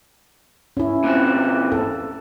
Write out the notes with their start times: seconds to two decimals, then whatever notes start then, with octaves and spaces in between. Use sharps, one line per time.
0.77 C#4 E4
1.04 A#2 E3 C4
1.72 A4